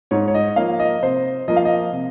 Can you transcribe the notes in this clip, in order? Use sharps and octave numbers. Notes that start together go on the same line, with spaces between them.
G#2 C#5
C#5
D#5
F3 A#3 F5
D#5
C3 C5
F3 A#3 D#5
F5
D#5
C3